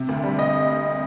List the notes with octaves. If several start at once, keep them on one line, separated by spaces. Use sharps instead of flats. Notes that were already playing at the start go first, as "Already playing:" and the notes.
Already playing: C3
D2
G3
D#5